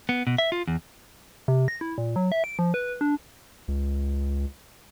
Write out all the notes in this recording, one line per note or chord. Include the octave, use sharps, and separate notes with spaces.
B3
B2
E5
F4
E2
C3
A#6
E4
A#2
F#3
E5
D7
F3
B4
D4
C#2